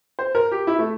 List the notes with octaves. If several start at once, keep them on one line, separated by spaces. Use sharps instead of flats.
C5
A#4
G4
E4
A3